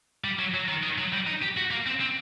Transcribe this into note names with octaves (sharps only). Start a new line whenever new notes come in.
G3
F#3
F#3
D#3
D#3
F#3
G3
D#4
G4
F#4
A#3
C4
C4